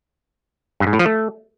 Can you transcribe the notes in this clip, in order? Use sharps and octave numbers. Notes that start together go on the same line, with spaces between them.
G2
G#2
A2
F3
A3